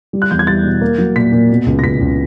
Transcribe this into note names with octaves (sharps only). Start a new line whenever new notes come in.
G3
F#6
E2 G6
G#6
G3 A6
B2
A#3
F#3
A#2 B6
A#2
B2
C#2
A#6
C#2 B6
C#2